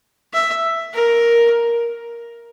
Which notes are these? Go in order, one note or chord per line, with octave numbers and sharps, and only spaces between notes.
E5
A#4